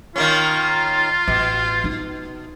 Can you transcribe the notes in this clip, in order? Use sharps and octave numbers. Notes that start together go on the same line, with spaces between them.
D#3 A#3 C#4 F4
A1 B2
D#4